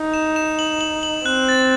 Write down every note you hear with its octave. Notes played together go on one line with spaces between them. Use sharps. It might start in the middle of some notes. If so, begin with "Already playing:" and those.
Already playing: D#4
E7
E7
F#7
F#7
F#7
C4 F#6
A6